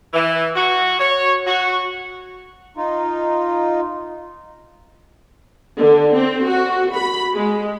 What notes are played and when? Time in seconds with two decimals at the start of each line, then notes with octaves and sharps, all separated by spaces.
0.14 E3
0.56 F#4
0.99 C#5
1.46 F#4
2.77 D#4 F4
5.78 D3
6.16 C4
6.48 F#4
6.95 B5
7.34 G#3